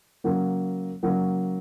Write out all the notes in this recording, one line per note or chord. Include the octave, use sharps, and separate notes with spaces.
C#3 F#3 A#3
C#3 F#3 A#3